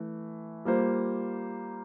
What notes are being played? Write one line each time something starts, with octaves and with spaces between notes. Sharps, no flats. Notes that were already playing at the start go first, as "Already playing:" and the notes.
Already playing: E3 A3
G3 A#3 F4 C5